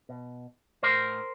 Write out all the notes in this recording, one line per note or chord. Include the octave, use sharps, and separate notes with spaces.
B2
A2 A#4 C5